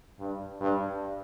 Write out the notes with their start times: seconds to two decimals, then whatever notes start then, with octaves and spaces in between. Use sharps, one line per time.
0.19 G2
0.61 G2